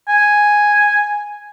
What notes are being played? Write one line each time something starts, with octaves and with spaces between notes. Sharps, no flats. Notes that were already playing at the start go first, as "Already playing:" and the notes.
G#5